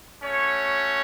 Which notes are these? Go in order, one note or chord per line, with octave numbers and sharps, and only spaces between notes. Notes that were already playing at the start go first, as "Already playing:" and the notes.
A3 C#4 F#4 C#5